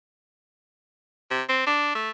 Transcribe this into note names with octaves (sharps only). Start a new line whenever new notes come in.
C3
C4
D4
A3